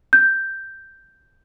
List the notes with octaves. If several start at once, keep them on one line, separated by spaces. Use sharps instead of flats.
G6